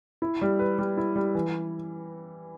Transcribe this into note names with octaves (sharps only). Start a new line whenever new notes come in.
E4
G3
B4
G3
E4
G3
E3